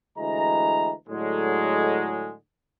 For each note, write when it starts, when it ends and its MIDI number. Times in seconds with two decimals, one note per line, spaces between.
0.18 0.93 38
0.18 0.93 52
0.18 0.93 56
0.18 0.93 82
1.09 2.34 45
1.09 2.34 50
1.09 2.34 54
1.09 2.34 56